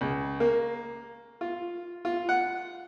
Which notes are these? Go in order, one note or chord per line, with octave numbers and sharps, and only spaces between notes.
C#2
A#3
F4
F4
F#5